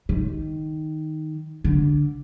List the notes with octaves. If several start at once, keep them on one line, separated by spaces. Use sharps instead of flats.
D#3
D3